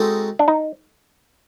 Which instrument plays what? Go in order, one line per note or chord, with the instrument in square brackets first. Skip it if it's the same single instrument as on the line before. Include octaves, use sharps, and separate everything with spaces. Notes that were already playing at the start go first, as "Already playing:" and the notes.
Already playing: [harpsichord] G#3 C4 D#4 F#4 A4
[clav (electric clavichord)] D4
D#4